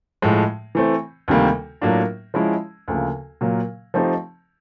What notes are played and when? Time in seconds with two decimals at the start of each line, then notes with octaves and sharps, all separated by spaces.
0.22 A2 F3 G#3
0.75 E3 A3 C4
1.28 D2 C3 D#3 G3 A#3
1.82 A2 F#3 A#3 D4 F4
2.34 F3 G#3 C#4 E4
2.88 D2 C#3 F3 A#3
3.41 A#2 F#3 A#3
3.94 F3 A3 C4 D#4 G4